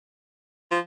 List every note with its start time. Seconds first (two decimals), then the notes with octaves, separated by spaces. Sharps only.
0.71 F3